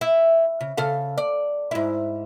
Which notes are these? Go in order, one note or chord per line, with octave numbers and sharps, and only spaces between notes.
E4
C#3
C#3 A4 F5
D5
G#2 E4